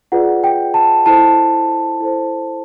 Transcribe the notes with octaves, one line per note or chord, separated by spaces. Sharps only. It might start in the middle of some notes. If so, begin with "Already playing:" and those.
F4 G#4 B4 D5 F#5
G5
A5
E4 A4 C5 A5
E4 A4 C5